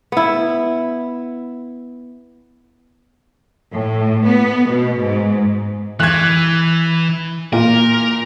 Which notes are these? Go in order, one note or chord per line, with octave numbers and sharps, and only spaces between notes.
B3 E4
A2
B3
B2
G#2
E3 F#6 G#6
A#2 A#4